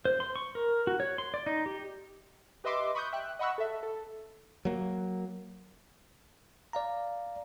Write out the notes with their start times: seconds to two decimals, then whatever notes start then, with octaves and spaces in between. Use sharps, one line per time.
0.05 C5
0.20 C6
0.36 C#6
0.55 A#4
0.87 F#4
1.00 C#5
1.18 C6
1.34 D5
1.46 D#4
1.66 G4
2.64 G4 B4 D#5 E5 C6 D6
2.95 B5 C#6 D#6 F#6 G6
3.12 E5 G5 F#6
3.39 D#5 F#5 B5 C#6 E6 F#6
3.58 A4 E5
3.83 A4
4.65 F#3 A#3
6.73 D5 F5 A#5